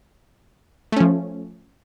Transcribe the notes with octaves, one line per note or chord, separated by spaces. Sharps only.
F3 A3 C#4